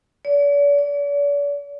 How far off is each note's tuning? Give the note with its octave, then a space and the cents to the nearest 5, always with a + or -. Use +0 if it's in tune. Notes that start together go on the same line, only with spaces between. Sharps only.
D5 -45
D5 -45